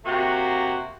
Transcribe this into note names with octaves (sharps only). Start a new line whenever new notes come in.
C3 A#3 F#4